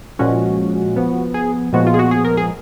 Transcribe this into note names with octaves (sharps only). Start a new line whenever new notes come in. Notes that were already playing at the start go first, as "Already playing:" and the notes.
A#2 F3 G#3 C#4 F#4
F3 B3
G#4
A#2 F3 G#3 B3 F#4
F4
G#4
F#4
G#4
A#4
G#4